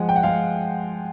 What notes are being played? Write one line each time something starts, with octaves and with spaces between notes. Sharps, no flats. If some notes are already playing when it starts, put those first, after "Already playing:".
Already playing: F3 G#3 F#5
G5
F#5
G#3 F5